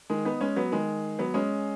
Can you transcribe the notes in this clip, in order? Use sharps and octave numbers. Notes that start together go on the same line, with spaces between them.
D#3 G#3
B3 D#4
G#3 C#4
F#3 B3
D#3 G#3
F#3 B3
G#3 C#4